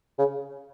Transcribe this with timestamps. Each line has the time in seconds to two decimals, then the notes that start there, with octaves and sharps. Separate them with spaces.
0.19 C#3